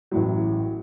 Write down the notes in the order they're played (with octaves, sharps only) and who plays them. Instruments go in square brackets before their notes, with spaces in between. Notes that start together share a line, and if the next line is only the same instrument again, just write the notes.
[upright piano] A1 A2 F#3